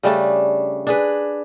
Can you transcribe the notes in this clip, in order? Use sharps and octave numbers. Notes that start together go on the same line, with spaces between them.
C#3 G3 A3 D4
D4 G#4 B4